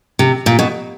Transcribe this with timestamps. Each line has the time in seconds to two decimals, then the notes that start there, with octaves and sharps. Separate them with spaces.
0.19 C3
0.46 A#2
0.59 B2